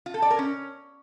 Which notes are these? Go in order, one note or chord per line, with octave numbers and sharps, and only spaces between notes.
F4
A4
D5
A#4
C#4